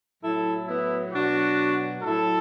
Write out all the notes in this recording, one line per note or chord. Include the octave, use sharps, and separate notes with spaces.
A2 F#3 E4 A4
B3 E4
B2 F#3 D4 F#4
A2 F#3 E4 A4